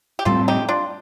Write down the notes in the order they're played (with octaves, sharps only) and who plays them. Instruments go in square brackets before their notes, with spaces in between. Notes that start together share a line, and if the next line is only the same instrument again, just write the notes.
[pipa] G4
[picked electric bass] A2 G3 C4 [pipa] F4 A4
[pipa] D#4 G4
D4 F4